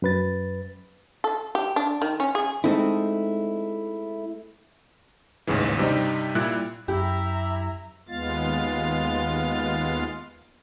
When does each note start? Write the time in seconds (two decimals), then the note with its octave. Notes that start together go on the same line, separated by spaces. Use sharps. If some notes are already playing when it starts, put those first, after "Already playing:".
0.02 F#2 B4 A6
1.24 A4
1.55 G4
1.76 D4
2.02 D#3
2.20 C#4
2.35 G#4
2.64 G#3 A3 C4 D#4 E4
5.47 A1 D#2 G#2 C#3 E3
5.78 G2 C3 G3 C4 D#4
6.35 A#2 G3 E4 F#6
6.88 F#2 E4 G4 E5 A#5
8.08 D#2 G#3 B3 F4 F5 A6